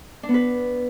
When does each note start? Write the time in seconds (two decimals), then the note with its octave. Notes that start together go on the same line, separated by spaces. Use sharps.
0.23 D4
0.29 B3
0.34 B4